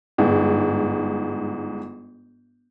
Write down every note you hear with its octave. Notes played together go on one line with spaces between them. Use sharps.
G1 G#2